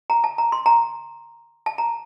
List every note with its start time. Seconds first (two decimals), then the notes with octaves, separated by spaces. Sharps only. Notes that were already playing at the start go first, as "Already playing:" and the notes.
0.10 A#5
0.24 A5
0.38 A#5
0.52 C6
0.66 A#5
1.66 A5
1.78 A#5